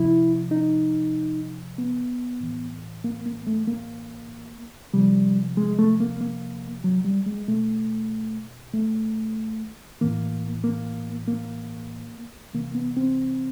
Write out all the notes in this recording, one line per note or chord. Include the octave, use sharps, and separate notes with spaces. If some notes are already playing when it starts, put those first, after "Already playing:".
Already playing: C3 F3 E4
D#4
B3
A2 E3
A#3
A#3
A3
A#3
C3 F3 G3
G#3
A3
A#3
A#3
F#3
G3
G#3
B2 A3
A3
A2 E3 A#3
A#3
A#3
C3 E3 A#3
B3
C4